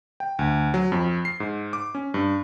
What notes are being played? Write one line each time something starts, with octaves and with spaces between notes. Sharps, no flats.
G5
D2
F#3
F2
C7
G#2
D6
C#4
G2